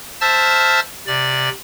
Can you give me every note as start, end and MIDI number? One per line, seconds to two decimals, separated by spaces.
0.21 0.80 72
0.21 0.80 76
0.21 0.80 81
0.21 0.80 88
0.21 0.80 89
0.21 0.80 93
1.07 1.49 48
1.07 1.49 74